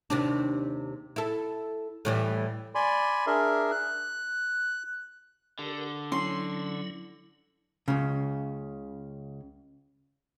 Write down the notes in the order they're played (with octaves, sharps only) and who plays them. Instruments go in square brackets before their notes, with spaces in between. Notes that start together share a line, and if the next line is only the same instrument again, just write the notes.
[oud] D#2 C3 D4
E4 A4
A2 E3 G3
[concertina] D5 G#5 B5 C6
D4 G#4 A#4 E5
F#6
[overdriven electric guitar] D3 [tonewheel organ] G4 A#4
[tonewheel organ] F#3 E4 [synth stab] C#4 [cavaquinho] C6
[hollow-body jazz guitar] C#2 C#3